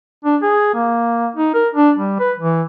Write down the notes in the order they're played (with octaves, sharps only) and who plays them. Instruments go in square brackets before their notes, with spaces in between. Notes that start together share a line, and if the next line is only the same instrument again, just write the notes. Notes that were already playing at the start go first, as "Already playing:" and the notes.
[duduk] D4
G#4
A#3
D#4
A#4
D4
G3
B4
E3